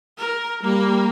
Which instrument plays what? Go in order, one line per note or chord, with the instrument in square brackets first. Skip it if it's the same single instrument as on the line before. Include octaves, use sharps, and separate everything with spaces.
[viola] A#4
[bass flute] G3 [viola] A#3